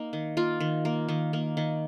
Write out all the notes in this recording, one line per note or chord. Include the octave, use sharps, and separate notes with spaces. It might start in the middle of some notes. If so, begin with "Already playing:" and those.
Already playing: A#3 D#4
D#3
A#3 F4
D#3
A#3
D#3
A#3
D#3